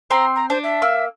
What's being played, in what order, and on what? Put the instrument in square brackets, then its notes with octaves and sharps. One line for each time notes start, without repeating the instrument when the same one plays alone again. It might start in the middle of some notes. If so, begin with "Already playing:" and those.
[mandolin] C4 G5 C6 [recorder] A#5
[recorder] A#5
[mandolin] D4 [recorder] C5
[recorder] E5
[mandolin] A#3 E6